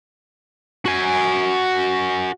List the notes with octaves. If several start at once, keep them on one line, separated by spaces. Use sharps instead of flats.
F#4 G#5